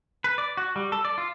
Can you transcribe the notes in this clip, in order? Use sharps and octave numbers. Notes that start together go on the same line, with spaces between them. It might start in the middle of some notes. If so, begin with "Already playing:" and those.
B4
D5
F#4
G3
A4
D5
F4